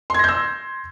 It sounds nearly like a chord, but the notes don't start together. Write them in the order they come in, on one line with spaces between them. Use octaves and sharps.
C6 G#6 A#6 G6 E6